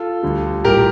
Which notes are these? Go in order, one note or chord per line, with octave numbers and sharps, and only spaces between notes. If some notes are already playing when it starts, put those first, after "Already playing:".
Already playing: F4 A4
D2 D3 G3
A#1 A2 G3 G4 A#4